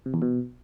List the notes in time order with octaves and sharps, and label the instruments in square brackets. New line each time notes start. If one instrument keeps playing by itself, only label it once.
[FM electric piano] C3
E2
B2